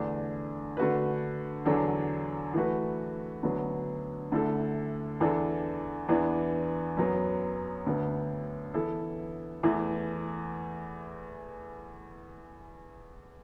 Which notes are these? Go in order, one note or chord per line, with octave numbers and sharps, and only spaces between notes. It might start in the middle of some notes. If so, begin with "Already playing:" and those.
Already playing: E2 D3 A3 D4
D3 A3 F#4 B4
E2 D3 F#3 D4 A4
E3 A3 F#4 B4
D2 D3 F#3 B3
D2 D3 A3 E4 A4
E2 E3 D4 A4
E2 E3 B3 D4
F#2 F#3 B3
D2 D3 B3
E3 B3 E4 A4
E2 E3 A3 E4